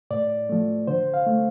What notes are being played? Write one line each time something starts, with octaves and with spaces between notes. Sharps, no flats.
A2 D5
F3 A3
D3 C5
F5
A3